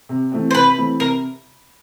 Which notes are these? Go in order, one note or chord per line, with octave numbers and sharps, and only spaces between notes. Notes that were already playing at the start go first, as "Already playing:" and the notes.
C3
E3 A3 C4
C5
C3 B4
E3 A3 C4
C3 A#4